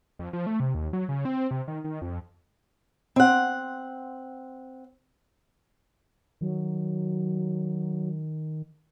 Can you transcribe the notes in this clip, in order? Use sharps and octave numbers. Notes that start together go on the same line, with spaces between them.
F2
F3
A3
C3
D#2
F#3
C#3
C4
C3
D#3
D#3
F2
C4 F#5
D#3 F#3